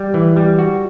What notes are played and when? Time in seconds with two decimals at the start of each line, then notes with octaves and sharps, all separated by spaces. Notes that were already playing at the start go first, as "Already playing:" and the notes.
Already playing: G3
0.14 E3
0.36 G3
0.59 F#4